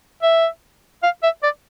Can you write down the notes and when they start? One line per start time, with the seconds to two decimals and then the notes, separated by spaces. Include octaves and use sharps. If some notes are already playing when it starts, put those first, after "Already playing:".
0.22 E5
1.03 F5
1.23 E5
1.43 D5